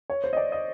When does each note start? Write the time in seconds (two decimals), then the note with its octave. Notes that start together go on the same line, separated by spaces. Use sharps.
0.10 C#5
0.24 C5
0.33 D#5
0.37 D5
0.52 D#5